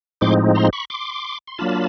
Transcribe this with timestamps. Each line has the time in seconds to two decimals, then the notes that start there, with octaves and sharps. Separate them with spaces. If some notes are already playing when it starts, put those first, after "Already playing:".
0.21 A2 F3 G#3 C4 D#4 C6 D6
0.55 A#5 C6
0.73 B5 C#6
0.90 C6 D6
1.48 C6
1.58 F#3 A#3 D4 F4 A5 B5